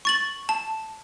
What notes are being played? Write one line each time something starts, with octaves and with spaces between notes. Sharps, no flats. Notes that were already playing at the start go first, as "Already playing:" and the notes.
C#6 A6 F#7
A5